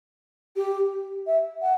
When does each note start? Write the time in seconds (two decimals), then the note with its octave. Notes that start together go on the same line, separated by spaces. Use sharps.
0.56 G4
1.27 E5
1.62 F#5